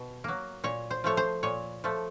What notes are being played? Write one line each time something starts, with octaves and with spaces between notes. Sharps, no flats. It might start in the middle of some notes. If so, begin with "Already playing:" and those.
Already playing: B2
F#3 A#3
A#2 C#5
C5
F3 A3 C#5
C5
A#2 C#5
F3 A3